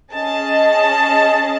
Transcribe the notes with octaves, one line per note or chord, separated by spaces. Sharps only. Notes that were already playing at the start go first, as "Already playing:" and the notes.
C#4 G#4 D#5 A5